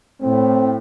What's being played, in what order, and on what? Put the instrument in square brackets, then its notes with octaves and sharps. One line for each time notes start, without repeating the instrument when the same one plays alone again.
[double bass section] A2 [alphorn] C4